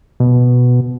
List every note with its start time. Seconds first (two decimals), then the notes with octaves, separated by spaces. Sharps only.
0.20 B2